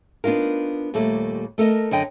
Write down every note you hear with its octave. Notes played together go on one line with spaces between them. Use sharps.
B3 D4 D#4 F4 A#4
D#2 A#2 G3 A3 A4
A3 A4 A#4 D#5
F#2 D3 D#5 G5